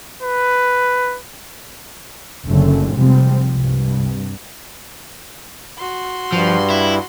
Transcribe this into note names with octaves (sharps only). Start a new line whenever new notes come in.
B4
F#1 F#2 D3 A3 C#4
F1 C3 F3 G3 G#3 C4
C2 G2
F#4 C6
G2 F3
E4